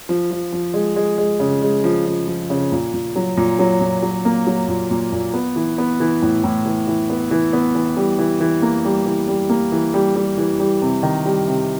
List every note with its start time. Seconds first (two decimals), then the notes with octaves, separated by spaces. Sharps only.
0.09 F3
0.31 F3
0.52 F3
0.74 G#3
0.96 G#3
1.18 G#3
1.40 C#3
1.62 G#3
1.84 F3
2.06 F3
2.28 F3
2.50 C#3
2.72 A#2
2.94 A#2
3.16 F#3
3.37 A#2
3.59 F#3
3.81 A#2
4.03 F#3
4.25 A#3
4.47 F#3
4.68 A#2
4.91 A#2
5.12 A#2
5.34 B3
5.56 E3
5.78 B3
6.00 E3
6.22 A2
6.44 A2
6.66 E3
6.87 E3
7.10 B3
7.31 E3
7.53 B3
7.75 E3
7.97 G3
8.19 E3
8.41 E3
8.62 A#3
8.85 G3
9.06 E3
9.28 G3
9.50 A#3
9.72 E3
9.94 G3
10.16 G3
10.38 E3
10.60 G3
10.82 C3
11.03 D#3
11.25 G3
11.47 C3